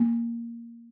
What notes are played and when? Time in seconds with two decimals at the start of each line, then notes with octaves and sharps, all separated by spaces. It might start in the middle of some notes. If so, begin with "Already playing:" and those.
Already playing: A#3